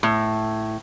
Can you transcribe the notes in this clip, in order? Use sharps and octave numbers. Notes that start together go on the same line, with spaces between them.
A2